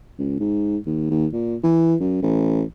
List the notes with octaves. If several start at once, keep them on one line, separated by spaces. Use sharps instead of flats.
C#2
G#2
D#2
D#2
A#2
E3
F#2
A1